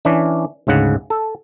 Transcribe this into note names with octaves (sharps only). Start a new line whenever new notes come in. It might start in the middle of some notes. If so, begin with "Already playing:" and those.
E3 C#4 D4
D2 G#2 C#3 F#5
A4